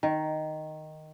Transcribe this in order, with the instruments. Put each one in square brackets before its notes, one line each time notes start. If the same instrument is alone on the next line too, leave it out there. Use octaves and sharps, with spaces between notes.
[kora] D#3